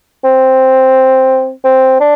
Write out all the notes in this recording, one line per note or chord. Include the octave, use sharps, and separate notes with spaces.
C4
C4
D4